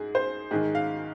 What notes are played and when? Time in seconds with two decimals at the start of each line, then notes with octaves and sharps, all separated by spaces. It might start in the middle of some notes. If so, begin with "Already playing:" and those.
Already playing: G#2 G#4
0.15 C5
0.51 G#2 D#3 G#4
0.75 F5